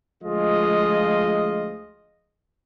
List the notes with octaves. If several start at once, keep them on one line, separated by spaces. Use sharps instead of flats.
D2 F3 G#3 F4 D#5